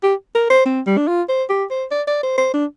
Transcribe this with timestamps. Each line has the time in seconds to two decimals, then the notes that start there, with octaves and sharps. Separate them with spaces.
0.03 G4
0.35 A#4
0.50 C5
0.66 C4
0.87 G3
0.97 D4
1.08 F4
1.29 C5
1.50 G4
1.71 C5
1.91 D5
2.07 D5
2.23 C5
2.38 C5
2.54 D4